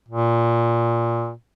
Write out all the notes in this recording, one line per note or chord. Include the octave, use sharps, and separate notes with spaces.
A#2